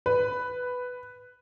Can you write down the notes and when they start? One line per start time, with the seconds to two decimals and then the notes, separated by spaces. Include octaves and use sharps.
0.06 B4